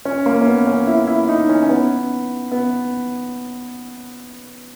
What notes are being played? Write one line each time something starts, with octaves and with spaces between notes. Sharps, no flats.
C#4
A#3
C#4
B3
C#4
E4
E4
D#4
C#4
C#4
B3
B3